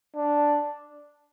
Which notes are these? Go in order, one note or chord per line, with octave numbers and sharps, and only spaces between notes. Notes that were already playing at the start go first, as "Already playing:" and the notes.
D4